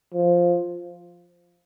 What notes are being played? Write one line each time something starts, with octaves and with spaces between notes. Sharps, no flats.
F3